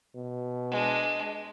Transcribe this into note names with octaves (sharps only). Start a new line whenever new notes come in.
B2
G#3 D4